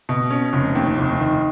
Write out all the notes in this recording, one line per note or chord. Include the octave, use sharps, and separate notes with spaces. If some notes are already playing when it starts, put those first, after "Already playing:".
B2
C#4
F1
D#2
F1
D#3